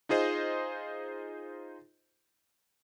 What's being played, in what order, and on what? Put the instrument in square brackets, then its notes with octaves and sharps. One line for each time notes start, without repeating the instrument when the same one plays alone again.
[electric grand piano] D#4 F4 G#4 C5 D#5